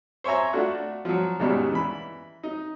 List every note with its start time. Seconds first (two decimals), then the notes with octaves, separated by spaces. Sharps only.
0.24 C5 C#5 E5 G#5 A#5
0.53 A3 D4 F4 F#4
1.05 F3 F#3
1.39 D#2 G#2 B2 G3 C#4
1.72 E3 B5
2.43 D#4